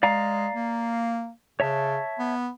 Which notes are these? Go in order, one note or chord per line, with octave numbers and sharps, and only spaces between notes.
G#3 D5 F5 A#5
A#3
C#3 C#5 E5 A5
B3